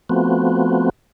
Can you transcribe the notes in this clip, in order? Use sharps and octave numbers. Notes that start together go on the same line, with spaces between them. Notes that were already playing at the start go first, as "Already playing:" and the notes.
F3 A3 B3 C4 F#4